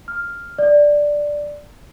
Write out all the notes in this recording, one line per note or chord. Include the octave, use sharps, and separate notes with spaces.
F6
D5